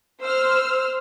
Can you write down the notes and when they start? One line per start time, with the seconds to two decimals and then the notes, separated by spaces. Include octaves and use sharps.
0.22 C5 E6 F6